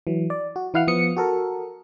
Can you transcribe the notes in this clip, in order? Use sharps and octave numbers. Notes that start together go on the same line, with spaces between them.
E3 F#3
D5
F#4
E3 E4 F5 F#5 F6
F3 B3 D#6 C#7
F#4 A4 A#4